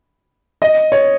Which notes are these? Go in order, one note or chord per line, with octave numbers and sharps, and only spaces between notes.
D#5
C#5